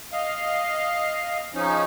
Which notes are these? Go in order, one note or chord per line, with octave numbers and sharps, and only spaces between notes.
D#5 F5
C#3 F3 C#4 D#4